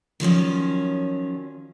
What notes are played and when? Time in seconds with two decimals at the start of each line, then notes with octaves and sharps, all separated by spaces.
0.20 D#3 F3 F#3 C#4